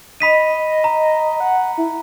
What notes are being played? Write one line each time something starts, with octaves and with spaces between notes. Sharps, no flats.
D#5 B5 B6 D#7
A#5
F#5
E4